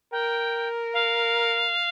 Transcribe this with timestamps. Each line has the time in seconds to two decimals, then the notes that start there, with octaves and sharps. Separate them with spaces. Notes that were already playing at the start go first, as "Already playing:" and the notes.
0.12 A#4 G5
0.94 F5